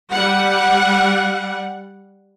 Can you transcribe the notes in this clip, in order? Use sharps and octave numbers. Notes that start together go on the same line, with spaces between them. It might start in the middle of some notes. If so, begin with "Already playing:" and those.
G3 F#5